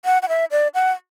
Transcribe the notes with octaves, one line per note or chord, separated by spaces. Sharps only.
F#5
F#5
E5
D5
F#5